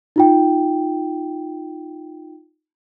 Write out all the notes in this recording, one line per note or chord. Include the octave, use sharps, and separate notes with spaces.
D#4 F4 G5